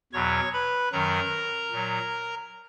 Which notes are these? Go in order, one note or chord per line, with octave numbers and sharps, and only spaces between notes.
E2 B2 F#3 C#5 C#6
B4 B5
F#2 D#3 F#3 A#4 A#5
A#2 F#3